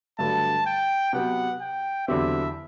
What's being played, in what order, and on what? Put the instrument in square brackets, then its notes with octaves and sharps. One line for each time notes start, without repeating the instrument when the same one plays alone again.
[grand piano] G2 D3 F#3 A3 [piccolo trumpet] A5
[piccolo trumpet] G5
[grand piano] C3 F#3 B3 [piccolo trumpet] F#5
[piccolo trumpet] G5
[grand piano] E2 D3 F#3 C4 G4 [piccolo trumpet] E5